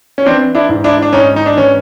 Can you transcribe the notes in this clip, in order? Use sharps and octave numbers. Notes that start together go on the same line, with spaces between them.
C#4
E3 C4 D4
D4 E4
G#2
D4 E4
D4
G#2 C#4 D#4
D#4
D4
E3 C#4